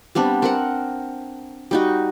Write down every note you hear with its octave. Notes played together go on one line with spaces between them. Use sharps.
G3 B3 C4 D4
C4 A#4 F#5
G3 D#4 F#4